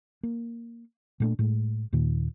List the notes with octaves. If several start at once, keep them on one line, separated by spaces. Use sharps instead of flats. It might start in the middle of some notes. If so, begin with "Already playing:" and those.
A#3
A#2 A3 D4
A2 G#3
D#2 A#2 D#3